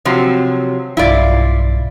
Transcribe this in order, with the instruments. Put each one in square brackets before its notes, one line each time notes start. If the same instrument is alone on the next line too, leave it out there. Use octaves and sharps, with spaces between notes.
[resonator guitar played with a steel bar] C3 F3 F#3
[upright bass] B1 G2 [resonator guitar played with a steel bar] E4 F4 D5